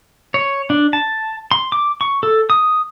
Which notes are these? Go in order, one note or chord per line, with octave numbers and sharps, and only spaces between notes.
C#5
D4
A5
C6
D6
C#6
A4
D#6